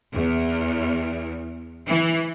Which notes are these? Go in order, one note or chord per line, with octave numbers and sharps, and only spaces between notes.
E2
E3